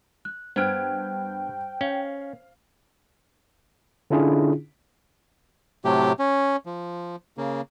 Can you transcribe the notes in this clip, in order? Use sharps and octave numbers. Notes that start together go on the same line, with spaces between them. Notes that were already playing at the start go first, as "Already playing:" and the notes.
F#6
G2 B3 C5 G5 F6 F#6 G#6 D7
C#4 F5
D3 C#4 D4 E4 F4 G#4
A2 C3 F#3 A3 G4
C#4
F3
C#3 A#3